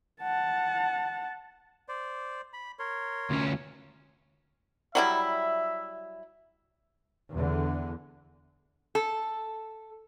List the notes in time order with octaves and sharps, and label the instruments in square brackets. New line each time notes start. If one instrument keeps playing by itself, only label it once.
[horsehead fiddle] F#5 A5
[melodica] C5 D5
B5
A#4 C#5 C6
[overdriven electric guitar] D2 C#4
[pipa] F#3 G3 E4 [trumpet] E5
[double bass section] E2 D3
[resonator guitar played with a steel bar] A4